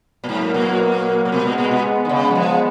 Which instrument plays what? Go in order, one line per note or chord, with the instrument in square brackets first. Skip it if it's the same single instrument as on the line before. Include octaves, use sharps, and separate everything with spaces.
[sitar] A#2
[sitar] G#2 [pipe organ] F#3 A#3
[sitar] A#2
A#2
[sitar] B2 [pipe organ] G#3 B3
[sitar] A#2
A#2
B2
D#3
C#3
F#3
F3